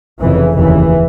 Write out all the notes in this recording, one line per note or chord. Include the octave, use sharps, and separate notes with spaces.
F1 F2 C#3 E3
F1 D#2 C#3 E3